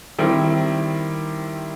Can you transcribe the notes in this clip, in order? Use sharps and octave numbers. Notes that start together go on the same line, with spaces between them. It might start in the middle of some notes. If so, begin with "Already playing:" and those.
D#3 G3 C4 E4